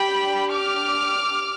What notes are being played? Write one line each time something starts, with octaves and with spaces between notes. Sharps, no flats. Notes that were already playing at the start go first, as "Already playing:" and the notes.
Already playing: D4 G4 G5 B5
D6 F6